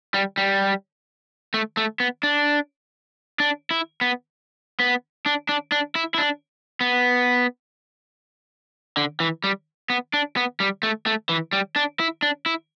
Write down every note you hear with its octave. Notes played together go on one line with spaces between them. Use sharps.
G3
G3
A3
A3
B3
D4
D4
E4
B3
B3
D4
D4
D4
E4
E4
D4
B3
D3
E3
G3
B3
D4
B3
G3
A3
A3
E3
G3
D4
E4
D4
E4